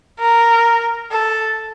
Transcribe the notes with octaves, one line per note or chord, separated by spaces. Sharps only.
A#4
A4